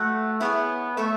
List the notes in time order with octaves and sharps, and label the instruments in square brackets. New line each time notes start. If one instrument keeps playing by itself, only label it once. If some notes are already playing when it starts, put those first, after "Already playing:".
Already playing: [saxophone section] A3 [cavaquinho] F#4 B4 F#5
[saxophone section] B3 [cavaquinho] E4 G#4 C#5 G#5
[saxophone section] A3 [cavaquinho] A4 C#5 E5